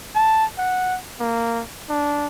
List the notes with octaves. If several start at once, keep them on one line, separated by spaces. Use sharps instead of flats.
A5
F#5
A#3
D4